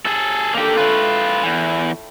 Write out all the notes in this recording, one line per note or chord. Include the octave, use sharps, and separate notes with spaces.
G#4 A4
A#3 D4 F4 G4 A4
E4 F4 B4 C#5 G5
E2 E3